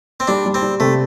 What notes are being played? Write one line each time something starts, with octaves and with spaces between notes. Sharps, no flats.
C4
G3 D4
G3
C4
G3
C3 A3